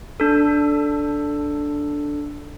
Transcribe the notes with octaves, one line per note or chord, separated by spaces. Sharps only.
D4 A4